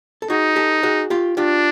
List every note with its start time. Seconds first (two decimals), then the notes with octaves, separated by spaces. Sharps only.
0.22 A4
0.30 D#4 F#4 G#4
0.56 G4 A4
0.83 F#4 G#4
1.10 F4 G4
1.37 D4 F4 G4